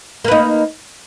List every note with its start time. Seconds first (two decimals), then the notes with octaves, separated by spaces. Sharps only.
0.25 A#3
0.28 B4
0.31 D#4